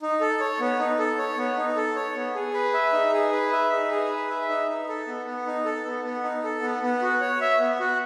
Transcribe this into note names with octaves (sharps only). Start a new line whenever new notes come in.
D#4
A4
C#5
B3
D#4
A4
C#5
B3
D#4
A4
C#5
B3
G#4
B4
E5
D#4
G#4
B4
E5
D#4
G#4
B4
E5
D#4
D#4
A4
B3
B3
D#4
A4
B3
B3
D#4
A4
B3
B3
F#4
C#5
E5
B3
F#4